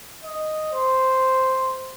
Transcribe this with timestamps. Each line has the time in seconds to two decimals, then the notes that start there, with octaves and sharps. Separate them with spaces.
0.24 D#5
0.72 C5